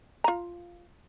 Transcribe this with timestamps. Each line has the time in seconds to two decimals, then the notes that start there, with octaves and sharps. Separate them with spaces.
0.24 F4 A#5